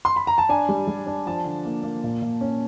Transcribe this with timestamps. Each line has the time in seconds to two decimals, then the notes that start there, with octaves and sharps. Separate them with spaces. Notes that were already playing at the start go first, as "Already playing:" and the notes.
0.05 C6
0.16 B5
0.27 A#5
0.38 A5
0.49 D4 G#5
0.69 G3
0.87 G3
1.07 D4
1.26 F3 A5
1.45 D3
1.65 A#3
1.83 A#3
2.04 A#2
2.22 A#2
2.41 C#4